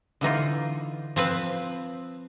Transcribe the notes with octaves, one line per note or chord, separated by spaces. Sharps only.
D3 E3 D#4 F4
F3 C4 B4